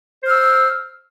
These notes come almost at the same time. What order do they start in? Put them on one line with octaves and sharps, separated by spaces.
C5 F6 E6